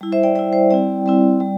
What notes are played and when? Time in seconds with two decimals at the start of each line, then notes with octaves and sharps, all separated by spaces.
0.01 G3 E4
0.12 C5 E5
0.23 D5 G5
0.35 G3 E4 D5 G5
0.53 C5 E5
0.70 G3 C4 E4 D5 G5
1.06 G3 C4 E4
1.40 G3